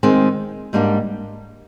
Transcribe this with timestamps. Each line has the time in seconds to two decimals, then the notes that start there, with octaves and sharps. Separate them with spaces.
0.03 D#3 G#3 C4
0.73 G#2 G3 A#3 D4